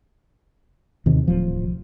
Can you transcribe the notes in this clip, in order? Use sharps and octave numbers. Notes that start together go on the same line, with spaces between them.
D#2 C3 D#3
D1 F3